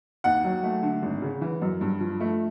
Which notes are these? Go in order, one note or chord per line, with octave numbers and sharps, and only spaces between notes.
D#2 F#5
F#3
A3
D3
G#1
C#3
E3
F#2
G2
F3
A3